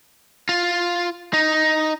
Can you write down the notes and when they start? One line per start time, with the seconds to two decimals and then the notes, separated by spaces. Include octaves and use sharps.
0.49 F4
1.34 D#4